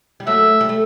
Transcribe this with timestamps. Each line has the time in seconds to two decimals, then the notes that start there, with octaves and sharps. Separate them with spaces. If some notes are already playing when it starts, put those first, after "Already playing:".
0.20 G3
0.27 F#3 A3 E5
0.61 G3
0.69 A3